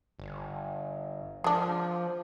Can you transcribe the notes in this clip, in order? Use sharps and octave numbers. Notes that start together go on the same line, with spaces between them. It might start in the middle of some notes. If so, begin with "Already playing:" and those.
G1
F3 G#3 D4